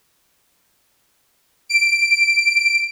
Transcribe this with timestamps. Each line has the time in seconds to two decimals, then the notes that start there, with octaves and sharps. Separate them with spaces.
1.69 D7